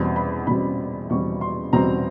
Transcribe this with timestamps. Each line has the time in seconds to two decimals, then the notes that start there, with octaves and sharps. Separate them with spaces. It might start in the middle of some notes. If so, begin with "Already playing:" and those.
Already playing: E2 B2 G3 C4
0.16 B5
0.47 E2 B2 G3 C4 B5
1.10 E2 B2 G3 C4 C#6
1.41 C6
1.73 E2 B2 G3 C4 A#5